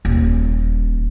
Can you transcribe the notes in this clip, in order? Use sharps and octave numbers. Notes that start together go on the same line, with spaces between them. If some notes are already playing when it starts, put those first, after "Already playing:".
D#1